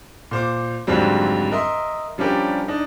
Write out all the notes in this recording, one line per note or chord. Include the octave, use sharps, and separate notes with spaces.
A#2 C5 D6
F2 G#2 D3 F#3 G3 C4
A#4 D#5 E5 C6
F3 G3 C#4 D4 G4 A#4
D4 D#4